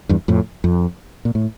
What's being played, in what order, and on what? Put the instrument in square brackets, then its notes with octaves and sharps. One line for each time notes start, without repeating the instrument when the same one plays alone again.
[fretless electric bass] E2 G2
F2 A2
F2
A#2
A2